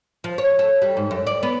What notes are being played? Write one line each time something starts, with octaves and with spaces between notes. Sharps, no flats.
F3
C#5
A4
G3
G#2
F#2
D5
B3